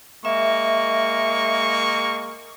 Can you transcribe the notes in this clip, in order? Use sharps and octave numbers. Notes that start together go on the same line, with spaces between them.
G#3 A#3 E5 C#6